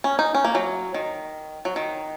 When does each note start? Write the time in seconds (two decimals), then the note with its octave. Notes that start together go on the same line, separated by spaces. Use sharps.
0.04 C#4
0.19 D#4
0.34 C#4
0.45 A#3
0.55 F#3
0.94 D#3
1.65 F#3
1.76 D#3